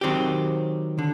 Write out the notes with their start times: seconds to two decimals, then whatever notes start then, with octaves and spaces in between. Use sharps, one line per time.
0.01 D#3 F#3 C4 G4
0.99 D3